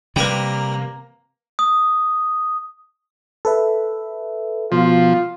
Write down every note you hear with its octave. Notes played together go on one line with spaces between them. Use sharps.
C3 G3 A#3 G4 A#4 B4 G5
D#6
A4 B4 E5
B2 F3 F4